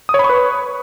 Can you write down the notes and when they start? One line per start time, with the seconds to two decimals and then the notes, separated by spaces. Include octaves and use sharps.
0.09 D#6
0.14 C#5
0.19 B5
0.24 C#6
0.29 B4